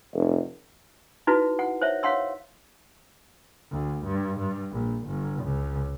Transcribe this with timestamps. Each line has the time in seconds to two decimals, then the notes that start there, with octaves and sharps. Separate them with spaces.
0.14 F1
1.27 D#4 E4 F#4 B4
1.59 F#5
1.82 C5 C#5 E5
2.03 C#5 F5 F#5 C6 E6
3.71 D2
4.04 G2
4.39 G2
4.72 A#1
5.07 G1
5.43 C#2